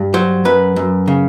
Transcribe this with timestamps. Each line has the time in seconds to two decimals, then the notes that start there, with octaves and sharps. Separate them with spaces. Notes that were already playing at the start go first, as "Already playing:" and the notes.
Already playing: G2
0.14 F#3 C5
0.45 F#2 B4
0.76 F#2
1.08 C#3